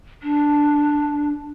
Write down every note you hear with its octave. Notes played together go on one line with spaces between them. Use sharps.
D4